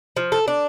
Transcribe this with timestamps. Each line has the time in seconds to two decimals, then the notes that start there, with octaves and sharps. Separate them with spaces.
0.17 F3
0.32 A4
0.48 D4